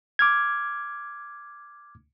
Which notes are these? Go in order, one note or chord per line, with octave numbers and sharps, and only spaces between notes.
D6 F6 G#6